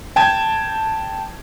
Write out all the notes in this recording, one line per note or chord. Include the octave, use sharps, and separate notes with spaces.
G5 A5 G#6